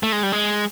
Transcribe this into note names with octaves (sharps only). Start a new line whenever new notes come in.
A3
G#3
G3
G#3